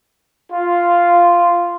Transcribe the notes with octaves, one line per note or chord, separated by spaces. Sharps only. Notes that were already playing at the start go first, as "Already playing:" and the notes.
F4